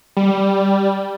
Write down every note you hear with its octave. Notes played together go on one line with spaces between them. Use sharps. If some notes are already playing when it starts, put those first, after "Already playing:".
G3